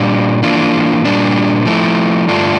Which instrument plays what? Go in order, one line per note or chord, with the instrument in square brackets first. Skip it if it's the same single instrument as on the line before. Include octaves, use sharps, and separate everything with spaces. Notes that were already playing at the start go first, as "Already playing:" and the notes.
Already playing: [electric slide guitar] A#2 G3 D4 F4
E3 A#3 D4 F4
A#2 G3 D4
F3 A3 E4
G2 D3 A3 D4 F4